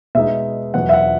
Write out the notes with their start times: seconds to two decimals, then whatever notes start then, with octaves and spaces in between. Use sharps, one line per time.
0.15 B2 G#3 D#4 E5
0.74 E2 B2 F#3 F#5
0.89 E5
0.94 F#5